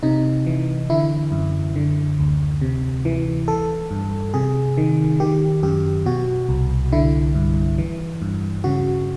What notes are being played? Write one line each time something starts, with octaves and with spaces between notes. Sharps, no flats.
C3 D#4
E3
D3 E4
F#2
D3
D2
C3
E3
E3 A4
G2
C3 G#4
D#3
D#3 G4
F#2 G4
B2 F#4
C2
D3 E4
G2
E3
G2
C#3 F#4